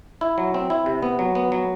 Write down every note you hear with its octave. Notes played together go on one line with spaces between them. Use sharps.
E4
F#3
C4
E4
C3
B3
F#3
B3
F#3